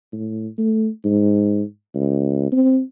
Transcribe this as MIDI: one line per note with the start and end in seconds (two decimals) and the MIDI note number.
0.13 0.47 45
0.58 0.88 57
1.05 1.62 44
1.95 2.52 37
2.52 2.81 60